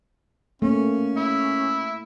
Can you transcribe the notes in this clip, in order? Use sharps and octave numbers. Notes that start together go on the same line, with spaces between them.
A3 A#3 C#4
E4